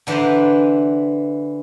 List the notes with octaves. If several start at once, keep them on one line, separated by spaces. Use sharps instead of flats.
D3 E3 D4 B4 C5 A#5